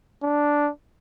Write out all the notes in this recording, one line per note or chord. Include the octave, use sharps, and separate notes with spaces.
D4